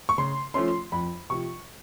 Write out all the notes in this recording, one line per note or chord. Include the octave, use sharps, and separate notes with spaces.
C#6
C#3 C6
F3 A3 C#4 C6
F2 B5
C3 F3 C#6